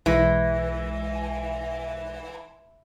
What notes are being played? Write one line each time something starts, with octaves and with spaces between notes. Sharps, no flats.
B1 E3 G#3 A#6